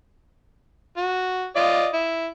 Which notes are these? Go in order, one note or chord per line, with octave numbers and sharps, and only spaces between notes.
F#4
F4 D5 D#5
E4